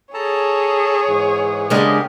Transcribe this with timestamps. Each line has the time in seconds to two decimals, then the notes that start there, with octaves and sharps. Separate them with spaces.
0.14 G#4 A4 C#5 A5 A#5
1.07 G#2 E3
1.70 C#3 G#3 B3 D4 G4 A#4